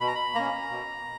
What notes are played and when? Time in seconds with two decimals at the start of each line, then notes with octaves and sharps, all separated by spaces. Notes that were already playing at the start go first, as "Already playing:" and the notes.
0.01 B2 B5
0.08 A#5
0.15 B5
0.35 A#3 C#4 A#5
0.70 B2